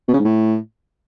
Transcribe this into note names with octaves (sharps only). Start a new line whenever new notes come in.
B2
C#3
G#2
A2